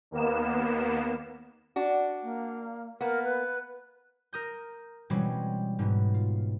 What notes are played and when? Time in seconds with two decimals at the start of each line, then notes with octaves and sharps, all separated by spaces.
0.11 D#2 A#3 B3 E7
1.76 D4 F#4
2.22 A#3
3.01 A#3 B3 A#4
3.24 B4
4.33 A#4 D#6 G6
5.10 B2 E3 G3 G#3 C4 C#4
5.79 G#2 B2 B3
6.14 F4